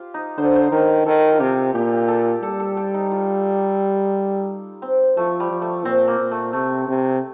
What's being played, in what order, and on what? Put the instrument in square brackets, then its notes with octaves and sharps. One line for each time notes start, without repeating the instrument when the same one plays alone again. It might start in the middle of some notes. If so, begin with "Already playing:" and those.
Already playing: [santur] F4 G4
D#4
[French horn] D3 [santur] C5
[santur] C5
[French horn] D#3 [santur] A#4
[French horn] D#3 [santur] A4
[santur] F4
[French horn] C3 [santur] G4
[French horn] A#2 [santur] G4
[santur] A4
[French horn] G3 [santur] A4
[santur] A4
G4
D#4
F4
C4
[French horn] F3 [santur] A3
[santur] G3
[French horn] F3
[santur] A3
[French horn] A#2 [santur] C4
[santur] A#3
[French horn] A#2
[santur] A3
[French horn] C3 [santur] A3
[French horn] C3